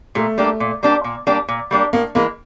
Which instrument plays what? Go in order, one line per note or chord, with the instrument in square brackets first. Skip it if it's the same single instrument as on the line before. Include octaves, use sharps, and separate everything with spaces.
[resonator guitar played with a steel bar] A#2 [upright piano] A3
[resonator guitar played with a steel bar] G3 A#3 D4 G4
A#2
G3 A#3 D4 G4
A#2
G3 A#3 D4 G4
A#2
G3 A#3 D4 G4
[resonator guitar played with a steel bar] A2 [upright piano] A#3
[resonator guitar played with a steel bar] E3 G#3 [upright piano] A#3